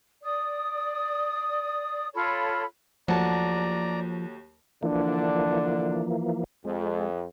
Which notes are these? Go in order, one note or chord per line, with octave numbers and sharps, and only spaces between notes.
D5 D#6
F4 A4 C#5 B5
D#2 F3 F#3 A3 D5 F#5 A5 A#5
D3 E3 F3 A#3 D4
F2 G#3